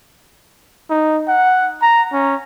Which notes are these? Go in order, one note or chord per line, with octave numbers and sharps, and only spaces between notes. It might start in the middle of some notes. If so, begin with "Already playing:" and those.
D#4
F#5
A#5
C#4